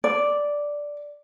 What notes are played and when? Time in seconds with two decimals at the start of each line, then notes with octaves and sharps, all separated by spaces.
0.04 D5